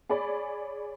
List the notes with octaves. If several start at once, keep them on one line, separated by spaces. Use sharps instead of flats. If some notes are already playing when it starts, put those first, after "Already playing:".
G#4 C#5 D5 B5